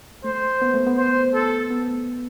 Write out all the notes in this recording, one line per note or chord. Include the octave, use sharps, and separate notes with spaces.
A3 C5
B3
A3
B3
C5
A4
B3